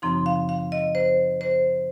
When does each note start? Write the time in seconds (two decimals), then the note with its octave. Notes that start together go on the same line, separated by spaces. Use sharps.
0.02 F#2 C#3 F3 C4 D#4 C6
0.26 F5
0.49 F5
0.72 D#5
0.95 C5
1.41 C5